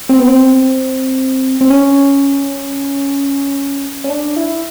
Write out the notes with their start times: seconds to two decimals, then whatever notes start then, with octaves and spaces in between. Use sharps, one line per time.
0.09 C4
0.19 B3
0.28 C4
1.61 C4
1.70 C#4
4.04 C#4
4.09 D4
4.36 E4